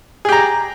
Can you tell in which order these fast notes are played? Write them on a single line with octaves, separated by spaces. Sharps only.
G#4 G4 A#5